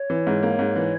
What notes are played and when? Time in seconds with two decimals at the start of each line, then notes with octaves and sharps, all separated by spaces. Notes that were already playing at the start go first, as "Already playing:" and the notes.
Already playing: C#5
0.10 E3
0.27 G#2
0.43 A#3
0.59 G#2
0.76 E3